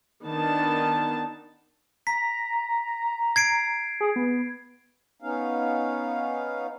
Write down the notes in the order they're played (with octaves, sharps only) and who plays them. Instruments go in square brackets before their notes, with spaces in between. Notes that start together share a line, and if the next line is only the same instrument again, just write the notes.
[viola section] D#3 B3 D4 A5
[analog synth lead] A#5 [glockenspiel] B6
[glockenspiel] G#6 C7 D7
[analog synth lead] G#4
B3
[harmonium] B3 C#4 D#4 F5